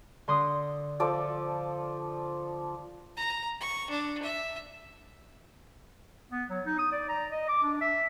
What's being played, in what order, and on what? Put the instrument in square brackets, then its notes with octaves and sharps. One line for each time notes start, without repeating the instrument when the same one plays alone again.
[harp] D3 C6 D#6
[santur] F3 A4 D5
[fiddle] A#5
C#6
D4
E5
[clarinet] B3
F#3
D#4
D#6
D5
A#5
D#5
D6
D4
E5